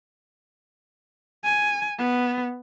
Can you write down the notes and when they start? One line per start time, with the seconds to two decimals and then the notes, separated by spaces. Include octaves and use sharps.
1.44 G#5
1.99 B3